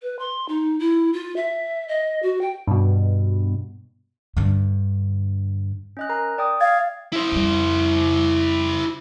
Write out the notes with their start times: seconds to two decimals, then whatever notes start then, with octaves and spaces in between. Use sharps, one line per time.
0.02 B4
0.19 C6
0.49 D#4
0.80 E4
1.13 F4
1.36 E5
1.88 D#5
2.23 F#4
2.41 G5
2.67 G2 B2
4.37 G2 D3
5.97 C#4 D#5 F#6
6.09 A#4 A#5
6.38 D5 G5 D#6
6.61 F5 G#6 A6
7.13 E4 C5
7.32 F2 G3